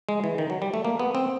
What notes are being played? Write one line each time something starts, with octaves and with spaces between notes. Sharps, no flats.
G#3
E3
D#3
F#3
G3
A3
A#3
B3
C4